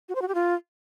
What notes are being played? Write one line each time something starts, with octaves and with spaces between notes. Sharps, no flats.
F#4
C5
F#4
G4
F4